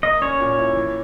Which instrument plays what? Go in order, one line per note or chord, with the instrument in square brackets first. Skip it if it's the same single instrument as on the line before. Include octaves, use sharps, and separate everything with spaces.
[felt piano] A#3 [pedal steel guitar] D#5
[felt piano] C#4 [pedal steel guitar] C#5
[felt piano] A#2
E4
E3